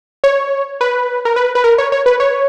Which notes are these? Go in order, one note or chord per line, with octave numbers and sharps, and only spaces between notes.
C#5
B4
A#4
B4
B4
A#4
C#5
C#5
B4
C#5